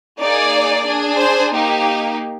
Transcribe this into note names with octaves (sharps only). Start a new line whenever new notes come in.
A#3 D#4 G#4 D5
D4 G#4
C5
A#3 D#4 G4